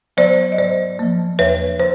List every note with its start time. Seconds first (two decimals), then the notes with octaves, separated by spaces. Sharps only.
0.17 F#3 B3 C5 D5
0.52 D#5
0.58 G#2 C5 D5
0.99 F3 A#3
1.39 E2 B4 C#5
1.80 C5